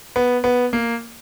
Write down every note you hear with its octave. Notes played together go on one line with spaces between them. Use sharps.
B3
B3
A#3